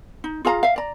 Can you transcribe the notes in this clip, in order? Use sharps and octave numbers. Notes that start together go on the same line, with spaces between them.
D#4
F4 G#4 F5 A#5
E5 F5
D5 A#5